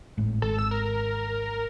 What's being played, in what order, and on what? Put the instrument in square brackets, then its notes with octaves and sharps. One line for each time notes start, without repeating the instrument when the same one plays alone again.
[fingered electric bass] G#1 A2
[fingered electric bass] G#1 [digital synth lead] A4
[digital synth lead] E6
A#4